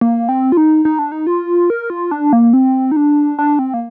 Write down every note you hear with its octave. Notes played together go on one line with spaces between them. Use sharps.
A#3
C4
F4
D#4
D#4
D4
D#4
F4
A#4
F4
D4
A#3
C4
D#4
D4
D4
C4
A#3